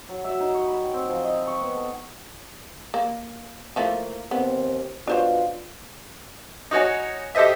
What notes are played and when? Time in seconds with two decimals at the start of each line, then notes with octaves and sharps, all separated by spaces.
0.09 F#3
0.24 E5
0.40 D#4
0.54 C#5
0.67 B5
0.81 G5
0.94 C4
1.08 F3
1.24 D#5
1.47 C#6
1.61 B3
1.77 A4
2.94 A#3
3.76 E3 F3 A3 A#3
4.31 D#2 B3 C4
5.07 B2 D4 F4 C5 C#5
6.71 D#4 F#4 C#5 G#5
7.35 G4 A4 C5 D#5 E5